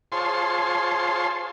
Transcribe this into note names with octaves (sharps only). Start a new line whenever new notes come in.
F4 G#4 C5 C#5 A5 C6